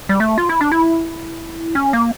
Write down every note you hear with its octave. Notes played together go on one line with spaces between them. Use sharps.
G3
A3
F4
E4
D4
E4
C#4
A#3